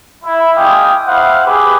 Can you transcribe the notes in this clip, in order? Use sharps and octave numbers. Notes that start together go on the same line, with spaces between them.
E4
G#3 F5 G5 G#5 D6 D#6
E4 C5 F5 F#5
G4 G#4 B4